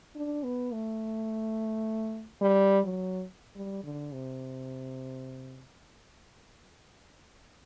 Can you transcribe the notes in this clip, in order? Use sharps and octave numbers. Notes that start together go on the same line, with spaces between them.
D4
B3
A3
G3
F#3
G3
D3
C3